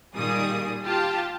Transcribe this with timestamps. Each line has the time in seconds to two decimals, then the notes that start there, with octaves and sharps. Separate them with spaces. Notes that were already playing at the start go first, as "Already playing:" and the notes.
0.15 A#2 D#3 G3 G#4 D#6
0.84 F4 G4 A5